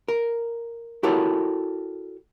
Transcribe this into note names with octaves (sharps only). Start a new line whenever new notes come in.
A#4
E4 F#4 G4 A4 A#4 C#5